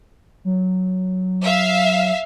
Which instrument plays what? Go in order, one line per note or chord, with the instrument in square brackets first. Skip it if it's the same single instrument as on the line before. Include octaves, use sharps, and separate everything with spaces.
[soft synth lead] F#3
[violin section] E5 F5